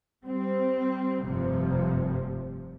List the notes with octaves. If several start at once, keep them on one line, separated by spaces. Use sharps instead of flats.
G3 C4
F1 G2 C3 F3